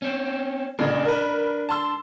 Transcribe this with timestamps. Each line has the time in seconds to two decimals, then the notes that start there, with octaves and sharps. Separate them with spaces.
0.02 C4 C#4
0.79 A1 A#2 C#3 D4
1.05 A#4 B4
1.69 A5 C6 E6